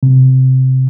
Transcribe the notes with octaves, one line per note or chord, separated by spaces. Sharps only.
C3